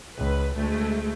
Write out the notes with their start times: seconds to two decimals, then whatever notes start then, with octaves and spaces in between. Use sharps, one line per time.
0.17 C#2 B4
0.56 D2 G#3 A3